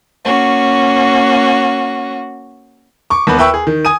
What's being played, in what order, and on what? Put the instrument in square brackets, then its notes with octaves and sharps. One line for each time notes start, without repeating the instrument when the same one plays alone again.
[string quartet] A#3 C#4 F#4
[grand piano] C#6 D6
D#2 B3 B4
B4 E5 G5 B5 C#6 E6
G#4
D#3
G#5 D#6 D#7